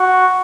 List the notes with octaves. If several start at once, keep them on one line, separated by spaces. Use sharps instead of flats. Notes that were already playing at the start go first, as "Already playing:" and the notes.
Already playing: F#4